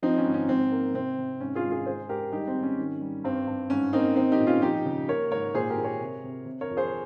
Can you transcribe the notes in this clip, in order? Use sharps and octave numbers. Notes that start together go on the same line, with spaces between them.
F3 C4 D#4
C#4
G#2
C#4
G#2 C4
A#3
C3 C4
C3
G#2 C#4
F4 G#4
G#3
F4 G#4
G#3 G#4 C5
G#3 G4 A#4
G3 D#4 G4
C4
G#2
C#4
D#3
G3
G2 C4
G2
G#2 C#4
A#3 C4 D#4
C4 D#4
D#4 G4
A#2
C#4 F4
F3 D#4 G4
C#3
A#3 A#4 C#5
G#2 A#4 C#5
A#2 G#4 C5
G4 A#4
A#2
A#4 C#5
C3
C3
C3
A#4 C#5
F2
G#4 C5